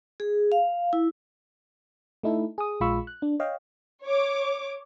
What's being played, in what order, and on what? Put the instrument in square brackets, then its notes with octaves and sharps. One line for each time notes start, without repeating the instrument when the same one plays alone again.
[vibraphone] G#4
F5
E4
[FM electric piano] A3 D#4 E4 A4
G#4 D#6
A#1 G#3 F4 B5 C#6 E6
F#6
D4
C#5 D#5 F5 G5
[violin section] C#5 D6